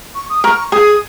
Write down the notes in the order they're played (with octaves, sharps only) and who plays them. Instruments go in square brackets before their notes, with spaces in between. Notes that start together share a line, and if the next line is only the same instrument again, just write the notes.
[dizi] C#6
D#6
[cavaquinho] A#4 [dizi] C#6
[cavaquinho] G#4 [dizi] D#6